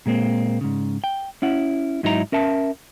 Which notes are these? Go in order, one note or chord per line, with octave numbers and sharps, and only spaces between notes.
A#2 G#3 A#3 C4
G#2 C#3
G5
C#4 E4 F#5
G#2 F#3 D#4 E4 A#4 A#5
C#4 A#4 E5 A5